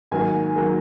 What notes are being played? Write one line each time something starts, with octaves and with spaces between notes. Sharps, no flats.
G#2 D#3 F#3 A#3 G#5
D#3 F#3 A#3